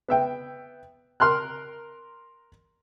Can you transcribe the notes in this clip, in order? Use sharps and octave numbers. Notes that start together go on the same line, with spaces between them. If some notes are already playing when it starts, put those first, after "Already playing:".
B3 E5 G5
A#4 C6 F6 F#6